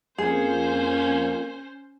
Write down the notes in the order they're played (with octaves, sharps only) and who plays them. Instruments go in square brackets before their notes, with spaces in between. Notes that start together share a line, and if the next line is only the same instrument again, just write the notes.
[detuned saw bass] F2 [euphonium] A#3 [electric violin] C#4 C5 [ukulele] G#4